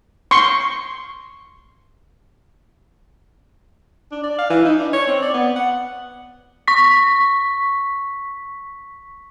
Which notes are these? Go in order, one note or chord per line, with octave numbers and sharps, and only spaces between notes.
C6 C#6
D4
D5
F5
E3
D#4
D4
C#5
C4
D5
B3
F#5
C#6 B6